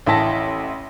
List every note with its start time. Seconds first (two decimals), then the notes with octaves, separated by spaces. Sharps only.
0.06 A1 E4 E5 G5 A5 A#6